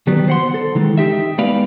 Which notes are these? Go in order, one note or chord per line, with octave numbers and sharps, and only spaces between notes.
D#3 F#3 G3 B3
C5 F#5 C6
A4
D#3 E3 G#3
D#4 G4 E5
G3 G#3 B3 B4 D5 F5